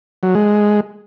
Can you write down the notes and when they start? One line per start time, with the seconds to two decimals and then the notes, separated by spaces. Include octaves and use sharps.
0.23 F#3
0.35 G#3